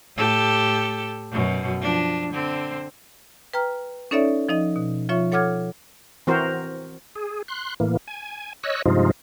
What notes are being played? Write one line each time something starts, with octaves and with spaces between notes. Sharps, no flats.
A2 G4 A4
F#2 B2
F3 D4
D3 C4
B4 G5 A#5 F6
C#4 D#4 A4 C#5 D5 E5
F3 D#4 D#5
B2
F3 F4 C#5 E5 C#6
A4 C#5 F#5 D6 F6 G#6
E3 C4 F#4 A#4 C5
G#4
C6 F#6
A2 E3 A#3
G#5
C#5 D#5 E6 F#6
G2 C3 F3 G#3 D#4 F4